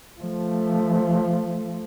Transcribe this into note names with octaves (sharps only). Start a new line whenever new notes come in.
F3 A3